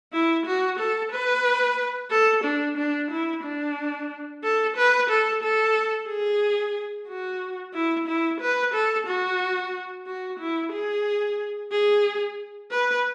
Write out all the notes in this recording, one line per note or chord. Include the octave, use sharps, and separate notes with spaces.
E4
F#4
A4
B4
A4
D4
D4
E4
D4
A4
B4
A4
A4
G#4
F#4
E4
E4
B4
A4
F#4
F#4
E4
G#4
G#4
B4